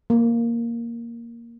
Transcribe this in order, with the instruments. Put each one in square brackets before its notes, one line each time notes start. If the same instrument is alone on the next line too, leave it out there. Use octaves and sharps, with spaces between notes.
[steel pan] A#3